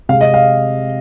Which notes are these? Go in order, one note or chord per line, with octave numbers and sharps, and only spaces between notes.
C3 G#3 C4 F5
D#5
F5